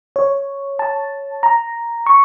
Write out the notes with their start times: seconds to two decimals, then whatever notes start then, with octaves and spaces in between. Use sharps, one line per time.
0.16 C#5
0.79 A5
1.43 A#5
2.06 C#6